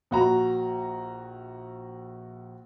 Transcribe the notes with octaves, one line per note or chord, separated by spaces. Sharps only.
A#1 F#4 A#5